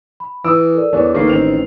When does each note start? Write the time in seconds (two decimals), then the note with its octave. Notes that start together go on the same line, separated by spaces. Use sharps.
0.20 B5
0.44 E3 D#6 E6 D7
0.74 A4 A#4 D5
0.93 E2 E3 D4 C#5
1.15 A#1 D#3 A3 A#3 B4 C7
1.27 A1 D#3 C4 F7